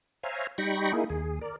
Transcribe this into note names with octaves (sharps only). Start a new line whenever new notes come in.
C5 C#5 E5 F5 G#5 A#5
G3 D#4 G5 B5 C#6 A#6
A#3 D#4 E4 G#4
D#2 G#4
A#4 D5